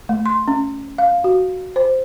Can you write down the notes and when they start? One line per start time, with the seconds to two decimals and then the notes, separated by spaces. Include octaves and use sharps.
0.09 A3
0.26 C6
0.48 C#4
0.98 F5
1.24 F#4
1.76 C5